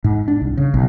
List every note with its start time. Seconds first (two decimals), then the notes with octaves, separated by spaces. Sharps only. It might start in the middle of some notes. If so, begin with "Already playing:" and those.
0.04 G#2
0.28 D4
0.41 C2
0.57 C#3
0.74 B1